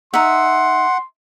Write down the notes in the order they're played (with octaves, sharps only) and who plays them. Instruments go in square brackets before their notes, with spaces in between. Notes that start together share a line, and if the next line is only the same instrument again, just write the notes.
[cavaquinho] D#4 E5 [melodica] F#5 [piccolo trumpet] C6